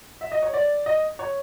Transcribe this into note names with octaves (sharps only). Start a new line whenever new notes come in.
E5
D#5
C#5
D5
D#5
C#5